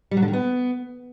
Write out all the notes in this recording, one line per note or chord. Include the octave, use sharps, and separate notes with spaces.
G3
F#3
D3
D#3
B3